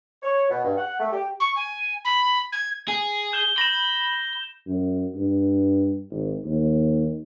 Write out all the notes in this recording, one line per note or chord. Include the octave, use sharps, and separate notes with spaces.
C#5
B2
G2
F#5
A3
G4
C#6
G#5
B5
G#6
G#4
G6 E7 G7
B5 A#6 E7
F#2
G2
G#1
D#2